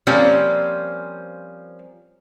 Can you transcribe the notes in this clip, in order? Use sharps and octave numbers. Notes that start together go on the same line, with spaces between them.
F3 G3 A#3 C4 C#4